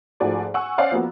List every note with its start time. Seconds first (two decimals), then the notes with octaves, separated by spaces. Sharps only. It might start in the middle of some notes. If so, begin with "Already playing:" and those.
0.20 G#2 F3 A3 F#4 D5 G#5
0.54 F#5 G#5 C#6 E6
0.78 C#4 C5 D5 F5 F#5 G#5
0.91 F3 A#3 B3 F#4